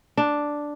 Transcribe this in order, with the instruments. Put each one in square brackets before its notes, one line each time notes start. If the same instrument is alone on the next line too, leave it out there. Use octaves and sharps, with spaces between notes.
[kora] D4